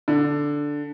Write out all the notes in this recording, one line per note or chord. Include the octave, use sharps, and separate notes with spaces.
D3